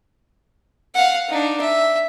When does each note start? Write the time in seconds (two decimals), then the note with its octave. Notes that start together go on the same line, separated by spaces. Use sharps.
0.95 F5 F#5
1.29 D4 D#4
1.61 E5